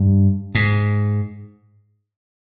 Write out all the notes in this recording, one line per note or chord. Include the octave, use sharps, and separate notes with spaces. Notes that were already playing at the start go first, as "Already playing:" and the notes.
Already playing: G2
G#2